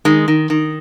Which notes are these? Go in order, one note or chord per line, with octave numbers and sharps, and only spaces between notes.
D#3 G#3
D#3
D#3